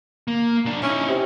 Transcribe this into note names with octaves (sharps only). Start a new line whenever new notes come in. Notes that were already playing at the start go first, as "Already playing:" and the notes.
A#3
B1 D4
C#4 D#4 E4
C3